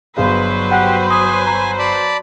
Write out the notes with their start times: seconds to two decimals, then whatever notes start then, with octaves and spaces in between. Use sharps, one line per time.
0.17 G1 F#3 G#4 B4 C5 F5
0.71 G4 F#5 G5 F#6
1.11 G#5 C6 D#6
1.46 A#5
1.79 D5 A5 B5